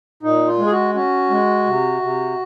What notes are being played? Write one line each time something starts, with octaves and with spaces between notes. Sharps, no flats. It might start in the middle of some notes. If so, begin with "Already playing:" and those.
A#2 D#4
F4
G#3
G#4
F#4
C#4 F#4
G#3
C3
C3